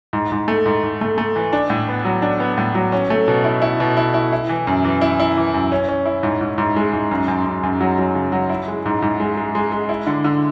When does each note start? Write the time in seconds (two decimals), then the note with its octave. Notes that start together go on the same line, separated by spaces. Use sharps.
0.13 G#2
0.32 G#2
0.48 A3
0.66 G#2
0.83 G#2
1.01 A3
1.18 A3
1.36 E3
1.53 D4
1.70 A2
1.88 B3
2.05 F#3
2.22 D4
2.40 B3
2.58 A2
2.75 F#3
2.92 C#4
3.10 A3
3.28 B2
3.44 E4
3.62 E4
3.80 B2
3.97 E4
4.14 E4
4.32 E4
4.49 E3
4.67 F#2
4.85 E3
5.01 E4
5.20 E4
5.37 E3
5.54 F#2
5.72 C#4
5.89 C#4
6.06 E4
6.23 G#2
6.41 G#2
6.58 G#2
6.76 G#3
6.93 G#2
7.11 F#2
7.28 F#2
7.46 F#2
7.63 F#2
7.80 F#3
7.98 F#3
8.15 C#3
8.32 F#3
8.50 E4
8.68 G#3
8.86 G#2
9.02 G#2
9.20 G#3
9.37 G#3
9.55 G#3
9.72 G#3
9.89 E4
10.07 D3
10.24 D3